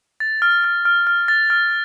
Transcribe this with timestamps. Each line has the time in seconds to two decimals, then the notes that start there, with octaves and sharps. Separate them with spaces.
0.20 A6
0.42 F6
0.64 F6
0.85 F6
1.07 F6
1.28 A6
1.50 F6